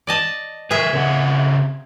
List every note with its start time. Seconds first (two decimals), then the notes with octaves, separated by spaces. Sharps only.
0.07 D5 D#5 A5
0.71 D#3 G#4 A#4 B4 E5
0.93 C#3 C4 F#5